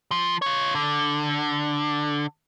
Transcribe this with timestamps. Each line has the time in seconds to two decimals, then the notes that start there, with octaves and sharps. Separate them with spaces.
0.11 F3
0.42 F4 C#5
0.75 D3